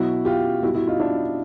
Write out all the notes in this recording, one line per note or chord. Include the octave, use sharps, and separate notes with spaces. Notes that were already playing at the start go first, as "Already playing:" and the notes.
Already playing: B2 F#3 E4 F#4
F4 G4
B2 G3 E4 F#4
E4 F#4
D#4 F4
D4 E4